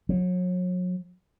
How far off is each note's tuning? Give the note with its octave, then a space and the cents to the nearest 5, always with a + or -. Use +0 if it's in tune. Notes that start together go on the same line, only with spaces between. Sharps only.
F#3 -35